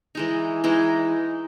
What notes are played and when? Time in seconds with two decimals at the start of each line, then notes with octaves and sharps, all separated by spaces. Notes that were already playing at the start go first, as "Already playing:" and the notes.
0.15 E3 G#3 D#4
0.64 E3 G#3 D#4